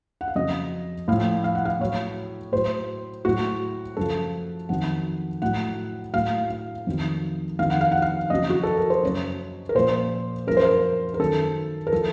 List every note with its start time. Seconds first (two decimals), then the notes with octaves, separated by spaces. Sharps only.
0.21 F#5
0.28 F5
0.35 F2 C#3 F#3 D#5
1.08 A2 F3 F5
1.44 F5
1.55 F#5
1.65 F5
1.80 A2 F#3 C#5
2.52 A2 F#3 C5
3.25 A2 F#3 F#4
3.97 F#2 C#3 F3 A4
4.69 F2 D#3 F#3 F#5
5.42 A2 F#3 F#5
6.13 A2 F#3 F5
6.50 F5
6.87 F2 D#3 F#3
7.59 F2 D#3 F#3 F5
7.70 F#5
7.81 F5
7.92 F#5
8.02 F5
8.30 F2 C#3 F#3 D#5
8.50 F#4
8.63 A4
8.77 A#4
8.90 C5
9.03 F#2 C#3 F#3 C#5
9.69 A#4
9.75 A#2 F3 C5
10.47 F#2 F3 A#4
10.57 C5
10.65 A#4
11.14 A#4
11.19 F#2 D#3 F#3 A4
11.87 A#4
11.93 F3 A4